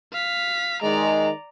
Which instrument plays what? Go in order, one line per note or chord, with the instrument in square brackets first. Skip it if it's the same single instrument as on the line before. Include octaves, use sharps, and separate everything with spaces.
[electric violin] F5 B6
[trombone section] D#3 G#3 [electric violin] D5 A#5